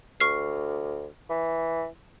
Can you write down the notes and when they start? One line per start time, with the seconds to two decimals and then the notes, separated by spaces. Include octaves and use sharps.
0.20 D2 C#6 F6 C7
1.30 E3